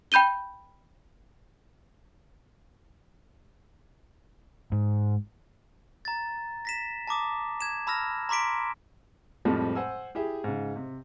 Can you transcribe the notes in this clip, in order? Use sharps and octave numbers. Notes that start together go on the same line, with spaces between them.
G5 B5 G6 D#7 G7
G#2
A#5 A6
A#6 B6 E7
A5 A#5 D6 D#6
G#6 E7
A5 B5 E6 F6 A#6
A#5 C6 D6 B6 D7
F2 A2 F3 G3 G#3 C4
C5 F#5 G#5 E6
E4 G4 G#4 E5
G#2 C#3
C3